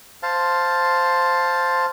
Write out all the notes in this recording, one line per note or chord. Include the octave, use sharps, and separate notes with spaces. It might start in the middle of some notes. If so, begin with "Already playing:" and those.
C5 F5 A5